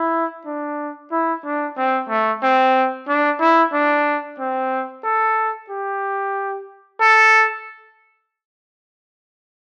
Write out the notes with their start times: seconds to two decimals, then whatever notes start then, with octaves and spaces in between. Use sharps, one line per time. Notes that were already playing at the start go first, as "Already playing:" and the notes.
Already playing: E4
0.46 D4
1.11 E4
1.45 D4
1.77 C4
2.09 A3
2.43 C4
3.08 D4
3.41 E4
3.73 D4
4.39 C4
5.04 A4
5.70 G4
7.01 A4